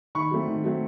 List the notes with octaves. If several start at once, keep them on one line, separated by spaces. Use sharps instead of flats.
D#3 B5 C#6
F#3 A3 C4
D#3
F#3 A3 C4